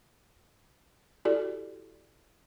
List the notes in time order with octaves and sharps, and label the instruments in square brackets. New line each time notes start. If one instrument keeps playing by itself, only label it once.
[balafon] E4 F#4 G4 A4 D5